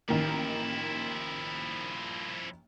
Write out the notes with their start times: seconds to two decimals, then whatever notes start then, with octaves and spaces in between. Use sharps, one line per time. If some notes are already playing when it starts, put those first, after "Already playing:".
0.09 A1 D#3 F3 A#3 E4